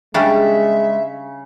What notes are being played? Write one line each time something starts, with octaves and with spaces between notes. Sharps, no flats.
C#3 G3 G#3 C#4 D4 E5